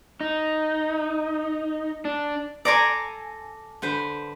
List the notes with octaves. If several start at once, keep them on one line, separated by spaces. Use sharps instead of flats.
D#4
D4
A4 D5 G#5 A#5 C6
D3 B4 C5